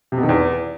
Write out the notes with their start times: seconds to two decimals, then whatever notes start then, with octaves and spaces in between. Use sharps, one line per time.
0.12 C3
0.18 B2
0.23 D#3
0.29 E2